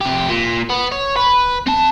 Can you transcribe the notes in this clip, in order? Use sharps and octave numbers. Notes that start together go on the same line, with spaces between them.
F2 G4
A#2
B3
C#5
B4
C4 A5